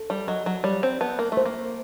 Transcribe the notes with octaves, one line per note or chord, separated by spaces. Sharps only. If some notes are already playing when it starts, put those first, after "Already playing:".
Already playing: A4
G3
F#3 D#5
F#3
G3 C#5
C4
B3 A5
A#3
A3
C5
A#3